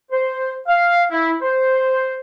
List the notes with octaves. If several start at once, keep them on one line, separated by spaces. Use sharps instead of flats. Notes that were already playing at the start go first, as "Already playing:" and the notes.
C5
F5
E4
C5